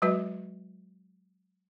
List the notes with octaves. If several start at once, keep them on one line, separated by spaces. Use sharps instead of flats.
F#3 G#3 F#4 B4 D#5